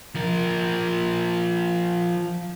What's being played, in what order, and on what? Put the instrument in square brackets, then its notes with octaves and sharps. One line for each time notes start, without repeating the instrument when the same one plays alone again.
[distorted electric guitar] F3 A#4